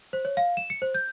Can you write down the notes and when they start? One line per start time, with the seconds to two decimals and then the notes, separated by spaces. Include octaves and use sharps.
0.13 C5
0.25 C#5
0.37 F5
0.57 E7
0.70 C#7
0.82 C5
0.94 G6